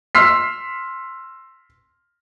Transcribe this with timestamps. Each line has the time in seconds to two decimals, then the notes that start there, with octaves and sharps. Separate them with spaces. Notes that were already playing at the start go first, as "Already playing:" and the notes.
0.15 C6 E6 F6 B6 C7